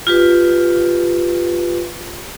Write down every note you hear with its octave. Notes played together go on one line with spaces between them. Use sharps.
F4 G4 B4